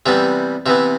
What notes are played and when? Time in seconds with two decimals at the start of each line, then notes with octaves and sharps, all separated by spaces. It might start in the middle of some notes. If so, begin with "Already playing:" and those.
0.06 C3 E3 G3 B3 E5
0.66 C3 E3 B3 E5